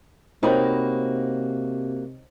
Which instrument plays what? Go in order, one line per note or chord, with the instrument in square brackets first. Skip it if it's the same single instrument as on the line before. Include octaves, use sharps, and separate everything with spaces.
[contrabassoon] C3 [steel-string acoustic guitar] A#3 F#4 [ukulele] D#4 B5 [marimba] C5 C#5 G5